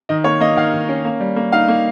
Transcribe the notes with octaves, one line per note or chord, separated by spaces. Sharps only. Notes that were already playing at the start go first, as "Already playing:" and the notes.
D#3 D#5
A#3 C#5
A#3 D#5
D#3 F5
D#3
C#4
A#3
G3
A#3
D#4 F5
A#3